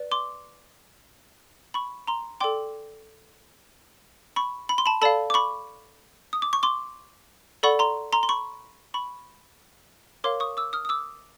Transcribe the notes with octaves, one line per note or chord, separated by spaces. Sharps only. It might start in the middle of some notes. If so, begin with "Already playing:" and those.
Already playing: B4 D5
C6 D6
B5 C#6
A#5 C6
A4 D5 G5 C6 D6
B5 C#6
B5
C6
A5 B5
A4 D5 F5 A5 B5
D6
B5 C#6
D#6
D6
C#6
C6 D6
A4 D5 F#5 B5 C#6
A#5 C6
A#5 C6
C6
B5 C#6
B5 C#6
A#4 C#5 F5 C6 D6
C#6 D#6
D6 E6
D#6 F6
D#6
D6 E6